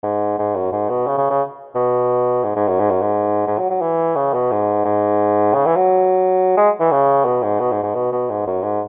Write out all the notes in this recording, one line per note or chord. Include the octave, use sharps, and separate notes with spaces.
G#2
G#2
F#2
G#2
B2
C#3
C#3
C#3
B2
G#2
G#2
F#2
G#2
F#2
G#2
G#2
F#3
F#3
E3
C#3
B2
G#2
G#2
C#3
E3
F#3
G#3
E3
C#3
B2
G#2
B2
G#2
G#2
B2
B2
G#2
F#2
G#2